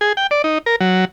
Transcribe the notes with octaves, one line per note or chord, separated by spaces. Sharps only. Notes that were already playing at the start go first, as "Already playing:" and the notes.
G#4
G5
D5
D#4
A#4
F#3